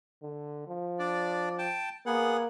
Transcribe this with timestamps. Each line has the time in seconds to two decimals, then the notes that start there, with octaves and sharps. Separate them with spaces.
0.23 D3
0.68 F3
0.99 D4 D5
1.58 G5 A5
2.06 A#3 B3 G#4 F#5